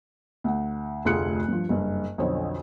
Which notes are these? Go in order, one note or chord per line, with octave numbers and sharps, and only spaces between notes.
D2 F#5
F1 D2 F4 G#4 F#6 C#7
G2 F3
F#1 G2
B1 F2 D3 C5 C#5